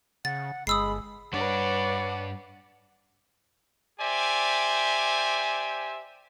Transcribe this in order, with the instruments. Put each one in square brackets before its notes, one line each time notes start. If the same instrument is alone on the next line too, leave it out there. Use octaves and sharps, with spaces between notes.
[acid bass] C#3 [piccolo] F#5 [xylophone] A6
[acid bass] G1 [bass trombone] G#3 [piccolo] B5 [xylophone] D#6 E6 C7
[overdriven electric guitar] G2 D4 [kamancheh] B4 C#5 [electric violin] D5 [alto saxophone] F#5
[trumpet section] G4 C5 D5 E5 G#5